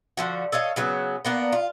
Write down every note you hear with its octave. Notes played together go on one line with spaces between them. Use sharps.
D3 F3 F#4
A4 C#5 D#5 F5
C#3 F#3 B3
A#3 B3 D4
F4